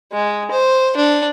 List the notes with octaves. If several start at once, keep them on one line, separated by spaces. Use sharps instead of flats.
G#3
C5
D4